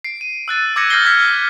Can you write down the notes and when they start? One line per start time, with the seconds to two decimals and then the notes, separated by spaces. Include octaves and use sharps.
0.04 C7 D7
0.21 D#7
0.48 E6 F#6 A6 D#7
0.76 D6 E6 G#6 A#6 C#7 D#7
0.90 F6 G6 A6 A#6 C7 G7
1.05 E6 F6 G#6 B6